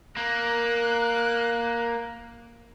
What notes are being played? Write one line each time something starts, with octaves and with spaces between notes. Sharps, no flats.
A#3 F#6